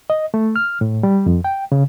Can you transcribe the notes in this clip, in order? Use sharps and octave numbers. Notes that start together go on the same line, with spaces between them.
D#5
A3
F6
A2
G3
F2
G5
C#3